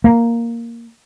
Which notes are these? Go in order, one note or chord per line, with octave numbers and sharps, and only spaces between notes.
A#3